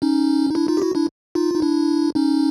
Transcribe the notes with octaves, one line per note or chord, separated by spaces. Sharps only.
C#4 D#4
D#4
D4 E4
D#4 F4
G4
E4 F#4
D4 E4
D#4 F4
D#4
D4 E4
C#4 D#4